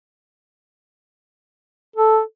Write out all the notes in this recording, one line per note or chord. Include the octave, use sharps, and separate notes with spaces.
A4